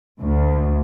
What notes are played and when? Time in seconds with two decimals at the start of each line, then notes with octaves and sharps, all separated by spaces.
0.21 D2